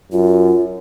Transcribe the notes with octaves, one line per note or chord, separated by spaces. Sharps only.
F#2 F4